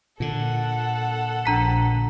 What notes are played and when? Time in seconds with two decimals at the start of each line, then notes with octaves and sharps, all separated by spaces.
0.20 A#2 D3 A4 F#5
1.46 A#1 D4 A#5 B6